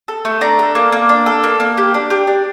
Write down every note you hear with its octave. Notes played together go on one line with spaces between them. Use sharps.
A4
A3
D4 A#5
A4
A#3
A#3
D4
A4
A#3
A#3
G4
D4
G4
D4